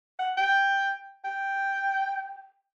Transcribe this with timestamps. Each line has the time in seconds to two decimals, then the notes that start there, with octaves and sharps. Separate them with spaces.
0.19 F#5
0.37 G5
1.25 G5